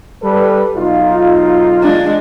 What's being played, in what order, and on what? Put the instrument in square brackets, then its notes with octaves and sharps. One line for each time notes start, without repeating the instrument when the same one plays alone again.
[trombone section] G3 A4 B4
B1 D#4 F4
[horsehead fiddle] G#3 D4